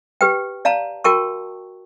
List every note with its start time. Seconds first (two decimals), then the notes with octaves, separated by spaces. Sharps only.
0.21 G4 B4 G5
0.65 D5 F5 A5 A#5
1.04 F#4 A#4 G5 A5 C#6